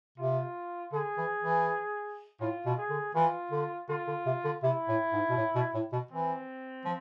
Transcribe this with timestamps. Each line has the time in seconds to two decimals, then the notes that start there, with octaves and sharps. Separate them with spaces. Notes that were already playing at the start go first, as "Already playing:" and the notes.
0.18 C3 F4
0.92 D3 G#4
1.17 E3
1.42 E3
2.41 A2 F4
2.65 B2
2.77 G#4
2.90 D3
3.14 E3 F4
3.52 D3
3.89 D3 F4
4.07 D3
4.26 C3
4.44 D3
4.63 C3 E4
4.88 A2
5.12 G#2
5.30 B2
5.37 A2
5.55 B2
5.74 A2
5.93 B2
6.11 E3 C4
6.85 F3